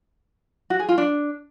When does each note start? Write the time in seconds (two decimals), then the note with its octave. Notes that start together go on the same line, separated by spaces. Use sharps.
0.70 F#4
0.79 G#4
0.89 F4
0.98 D4